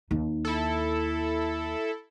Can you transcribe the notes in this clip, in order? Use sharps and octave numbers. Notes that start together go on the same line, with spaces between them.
D#2 D#4
E4 A4